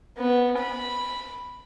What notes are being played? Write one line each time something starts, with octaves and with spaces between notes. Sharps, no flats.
B3
B5